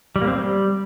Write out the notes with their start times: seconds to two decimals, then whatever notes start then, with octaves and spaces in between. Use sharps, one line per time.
0.16 G3
0.22 A#3
0.27 C4
0.33 G3